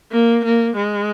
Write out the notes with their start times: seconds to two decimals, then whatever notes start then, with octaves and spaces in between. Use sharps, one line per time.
0.12 A#3
0.45 A#3
0.76 G#3